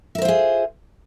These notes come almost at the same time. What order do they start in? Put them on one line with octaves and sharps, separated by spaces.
E5 A#4 C5 F4 G#4